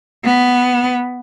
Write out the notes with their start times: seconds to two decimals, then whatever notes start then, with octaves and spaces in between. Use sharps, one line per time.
0.25 B3